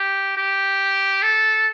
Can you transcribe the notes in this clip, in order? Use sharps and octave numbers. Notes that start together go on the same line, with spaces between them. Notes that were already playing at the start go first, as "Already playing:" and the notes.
Already playing: G4
G4
A4